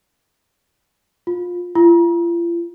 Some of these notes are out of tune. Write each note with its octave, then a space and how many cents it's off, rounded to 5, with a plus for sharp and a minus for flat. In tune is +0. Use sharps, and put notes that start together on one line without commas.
F4 +20
F4 -40